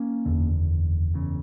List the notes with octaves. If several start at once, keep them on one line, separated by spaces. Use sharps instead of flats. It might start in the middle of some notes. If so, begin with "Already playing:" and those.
Already playing: A#3 C#4
F#1 E2 D3
F#1 E2 C#3